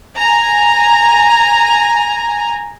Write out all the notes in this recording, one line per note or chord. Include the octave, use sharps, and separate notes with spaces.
G#5 A#5